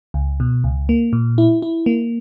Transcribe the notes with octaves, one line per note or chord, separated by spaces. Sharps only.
C#2
B2
C#2
A#3
A#2
E4
E4
A#3